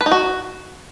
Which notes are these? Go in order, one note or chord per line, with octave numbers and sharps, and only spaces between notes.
B4
D#4
F#4